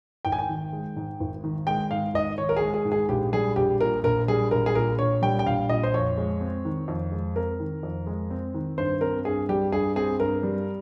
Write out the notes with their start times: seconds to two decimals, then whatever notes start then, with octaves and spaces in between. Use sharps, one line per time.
0.25 G#1 G5
0.32 G#5
0.39 G5
0.49 D#3
0.73 G#3
0.97 G#2
1.20 G#1
1.44 D#3
1.67 G#3 G5
1.91 G#2 F5
2.14 G#1 D#5
2.38 D#3 C#5
2.49 A#4
2.57 G#4
2.62 G#3
2.74 G#4
2.85 G#2
2.92 G#4
3.09 A#1 G4
3.33 G3 G#4
3.56 A#1 G4
3.80 A#2 A#4
4.04 A#1 A#4
4.28 G3 G#4
4.51 A#1 A#4
4.66 G#4
4.75 A#2 A#4
4.99 A#1 C#5
5.22 G3 G5
5.39 G5
5.46 A#1 F5
5.69 A#2 D#5
5.83 C5
5.94 F2 C#5
6.18 G#3
6.41 C4
6.65 D#3
6.88 F2
7.12 G#3
7.36 C4 A#4
7.60 D#3
7.83 F2
8.07 G#3
8.30 C4
8.54 D#3
8.78 G2 C5
9.01 C4 A#4
9.25 G2 G#4
9.49 G3 G4
9.72 G2 G#4
9.96 C4 G#4
10.19 G2 A#4
10.43 G3